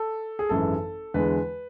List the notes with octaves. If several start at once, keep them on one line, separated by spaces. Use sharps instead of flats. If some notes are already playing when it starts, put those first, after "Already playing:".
Already playing: A4
G#4
G#1 F#2 E3 G#3 A4
E2 D3 G#3 B4